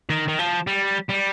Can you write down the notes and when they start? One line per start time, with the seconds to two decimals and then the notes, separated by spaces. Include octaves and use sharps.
0.10 D#3
0.28 D#3
0.39 F3
0.67 G3
1.09 G3